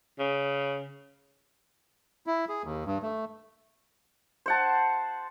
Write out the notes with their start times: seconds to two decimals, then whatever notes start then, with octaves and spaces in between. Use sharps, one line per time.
0.19 C#3
2.27 E4
2.49 G#4
2.64 D#2
2.86 G2
3.03 A3
4.46 C5 F#5 A5